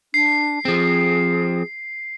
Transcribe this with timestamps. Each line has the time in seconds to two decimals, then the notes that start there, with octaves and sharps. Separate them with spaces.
0.14 D4 C7
0.65 F3 C4 G#4